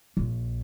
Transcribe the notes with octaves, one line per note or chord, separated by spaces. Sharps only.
A#1